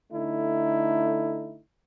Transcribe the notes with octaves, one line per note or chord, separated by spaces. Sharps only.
D3 A3 D#4 E4